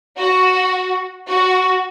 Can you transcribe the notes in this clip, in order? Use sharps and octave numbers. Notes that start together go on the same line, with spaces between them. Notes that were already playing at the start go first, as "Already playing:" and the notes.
F#4
F#4